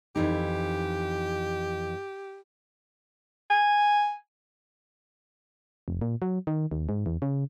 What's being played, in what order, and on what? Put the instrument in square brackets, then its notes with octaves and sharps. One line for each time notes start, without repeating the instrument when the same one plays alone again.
[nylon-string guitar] F2 E3 D#4 [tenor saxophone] G4
[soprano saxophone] G#5
[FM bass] F1
A#2
F#3
D#3
D#2
G#2
E2
C#3